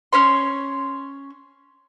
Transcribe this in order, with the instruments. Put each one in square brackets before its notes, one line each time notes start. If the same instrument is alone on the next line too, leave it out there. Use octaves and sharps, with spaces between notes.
[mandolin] C#4 C#5 C6